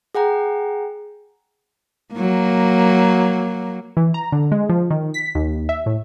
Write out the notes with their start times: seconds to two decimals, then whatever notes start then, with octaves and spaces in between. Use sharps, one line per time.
0.15 G#4 F#5 G5 A#5
2.15 F#3 A#3
3.97 E3
4.14 A#5
4.32 D3
4.52 G#3
4.69 F3
4.90 D#3
5.14 B6
5.35 D#2
5.69 E5
5.86 A2